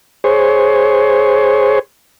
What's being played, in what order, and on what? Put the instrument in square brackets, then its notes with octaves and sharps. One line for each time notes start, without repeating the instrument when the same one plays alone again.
[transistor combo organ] G#4 C5 C#5